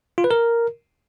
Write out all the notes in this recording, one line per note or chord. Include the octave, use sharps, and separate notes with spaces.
F4
B4
A#4